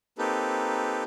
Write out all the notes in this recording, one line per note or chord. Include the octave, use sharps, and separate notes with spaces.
A#3 C4 D#4 G4 A4 B4